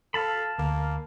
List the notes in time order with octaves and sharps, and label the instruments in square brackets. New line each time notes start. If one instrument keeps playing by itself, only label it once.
[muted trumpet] A4 [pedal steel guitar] F5 A5 B5
[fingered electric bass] D2 [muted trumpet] A#3